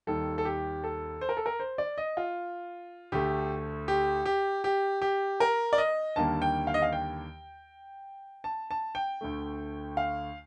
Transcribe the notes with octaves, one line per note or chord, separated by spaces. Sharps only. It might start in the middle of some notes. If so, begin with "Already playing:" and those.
D#2 D#3 G3 A4
A4
G4
A4
C5
A#4
A4
A#4
C5
D5
D#5
F4
D2 D3 A3 G4
G4
G4
G4
G4
A#4
D5
D#5
D#2 D3 G3 A#3 A5
G5
F5
D#5
F5
G5
A5
A5
G5
D2 D3 A3
F5